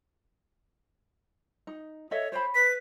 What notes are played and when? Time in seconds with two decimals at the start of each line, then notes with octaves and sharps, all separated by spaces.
1.67 D#4
2.11 A4 C#5 D#5 E5
2.32 C5 C#5 B5
2.55 B4 B6